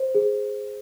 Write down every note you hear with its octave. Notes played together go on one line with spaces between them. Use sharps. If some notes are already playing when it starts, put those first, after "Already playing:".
Already playing: C5
G#4